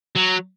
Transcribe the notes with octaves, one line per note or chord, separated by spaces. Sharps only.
F#3